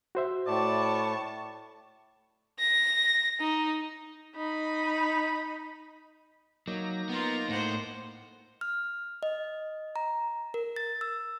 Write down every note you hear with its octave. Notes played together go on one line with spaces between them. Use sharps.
F#4 C5 E5
A2 D5 A5 C#6
A#6
D#4
D#4 B5
F#3 A#3 D#4 A#6
B3 F4 A#4
A2 C5 F#5
F6
D#5
A#5
A#4
A6
E6